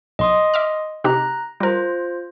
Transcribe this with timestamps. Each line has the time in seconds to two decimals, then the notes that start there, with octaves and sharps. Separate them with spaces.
0.19 B1 D#5 C6 D#6
0.54 E5 D6 F6
1.04 C3 D#4 G4 A#5 F#6
1.60 G3 F4 A#4 C5